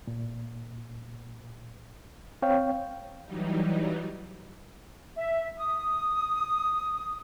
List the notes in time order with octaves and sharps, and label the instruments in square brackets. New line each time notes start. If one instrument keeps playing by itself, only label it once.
[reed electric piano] A#2
C4 C#5 F5 G5
[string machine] E3 F#3 G3 D#4
[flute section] E5
D#6